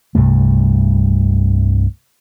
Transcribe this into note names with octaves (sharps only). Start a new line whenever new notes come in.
C2 G2 C3 A3